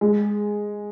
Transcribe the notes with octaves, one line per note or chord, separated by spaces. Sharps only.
G#3